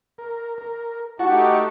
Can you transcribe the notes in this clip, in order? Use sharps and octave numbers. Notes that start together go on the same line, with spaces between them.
A#4
A#4
A3 D#4 F#4 G4 F#5 A5 C#6